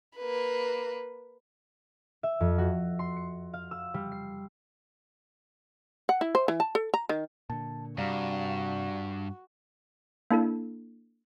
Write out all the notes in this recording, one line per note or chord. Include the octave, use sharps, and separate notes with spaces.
A#3 B4
E5
F2
F#4
C6
C#7
F5
E6
G3
C7
F#5
E4
C5
E3
A5
A4
A#5
D#3
A#2 D3 A5
G2 C3 G3 F#4 D5 F5 A#5
A#3 D4 E4 A4